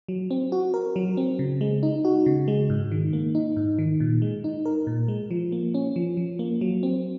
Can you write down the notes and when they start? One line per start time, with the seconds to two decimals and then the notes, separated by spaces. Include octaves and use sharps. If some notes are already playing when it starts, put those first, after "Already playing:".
0.08 F#3
0.31 C4
0.52 F#4
0.74 A#4
0.96 F#3
1.17 C4
1.39 C#3
1.61 G#3
1.83 D#4
2.05 F#4
2.26 C#3
2.48 G#3
2.70 G#2
2.92 D#3
3.13 A#3
3.35 D#4
3.56 G#2
3.78 D#3
4.00 A#2
4.22 G#3
4.44 D#4
4.65 A#4
4.87 A#2
5.08 G#3
5.31 F3
5.52 A#3
5.74 C#4
5.96 F3
6.17 F3
6.39 A#3
6.61 F#3
6.83 C4